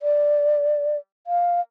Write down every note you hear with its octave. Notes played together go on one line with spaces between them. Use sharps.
D5
F5